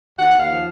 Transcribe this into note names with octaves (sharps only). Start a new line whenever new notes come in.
D#2 F#5
D#2
F5
F3